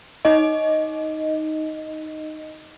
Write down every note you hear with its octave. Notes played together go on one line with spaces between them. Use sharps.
D#4 D#5